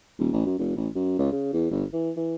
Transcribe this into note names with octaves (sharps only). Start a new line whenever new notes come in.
D#1
A1
F#2
F1
A1
F#2
C#2
C#3
E2
G1
E3
E3